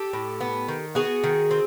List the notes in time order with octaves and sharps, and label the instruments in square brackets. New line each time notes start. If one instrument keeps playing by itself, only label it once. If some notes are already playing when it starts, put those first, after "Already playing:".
Already playing: [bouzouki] G4 A4
A2
B3
D#3
B3 F#4 G#4
D#3
C4